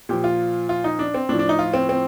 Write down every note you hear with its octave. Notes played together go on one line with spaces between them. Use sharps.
A#2 F3 G4
F4
F4
D#4
D4
C4
A2 F3 D4
D4
D#4
F4
C4
C4